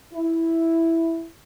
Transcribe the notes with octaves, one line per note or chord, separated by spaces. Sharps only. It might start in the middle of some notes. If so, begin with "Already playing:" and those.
E4